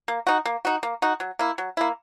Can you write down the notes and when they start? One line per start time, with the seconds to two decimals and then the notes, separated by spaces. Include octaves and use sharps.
0.08 A#3
0.27 D#4 F#4
0.46 A#3
0.65 D#4 F#4
0.83 A#3
1.02 D#4 F#4
1.20 F#3
1.39 A#3 E4
1.58 F#3
1.77 A#3 E4